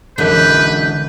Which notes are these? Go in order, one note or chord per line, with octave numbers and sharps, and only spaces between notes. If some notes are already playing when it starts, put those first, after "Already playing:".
B1 F#2 D3 E3 G#3 B4 G6